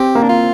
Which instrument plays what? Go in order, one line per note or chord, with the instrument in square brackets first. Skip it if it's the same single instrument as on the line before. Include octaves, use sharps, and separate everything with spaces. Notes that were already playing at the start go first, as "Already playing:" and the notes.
Already playing: [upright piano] C4 [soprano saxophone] G4
[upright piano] A#3
[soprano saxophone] D4
F4